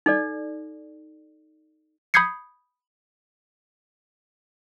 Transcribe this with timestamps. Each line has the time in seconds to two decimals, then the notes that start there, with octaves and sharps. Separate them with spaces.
0.06 D#4 A4 D5
2.14 B5 D#6 G6 G#6 C7 C#7